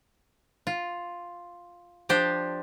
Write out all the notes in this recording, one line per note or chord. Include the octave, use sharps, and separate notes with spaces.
F4
F3 D4 G4 C5